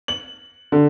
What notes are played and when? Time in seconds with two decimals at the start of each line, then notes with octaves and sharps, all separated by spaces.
0.08 F#7
0.72 D3